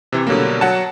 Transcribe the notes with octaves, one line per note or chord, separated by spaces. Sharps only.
C3 E3
B2 D3 F#3 G3 A#3
F#3 F#5 A5